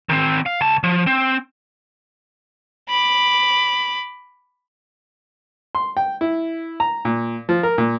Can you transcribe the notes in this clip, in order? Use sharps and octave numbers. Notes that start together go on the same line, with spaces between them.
D#3 C4
F5
C#2 A5
F3
C4
B5 D6
C6
G5
E4
A#5
A#2
F3
A#4
A#2